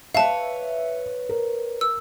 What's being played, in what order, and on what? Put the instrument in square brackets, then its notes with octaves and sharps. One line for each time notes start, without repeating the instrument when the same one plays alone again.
[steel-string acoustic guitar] B4 C#5 [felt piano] E5 [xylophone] F5 A5
[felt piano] A#4
[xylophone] E6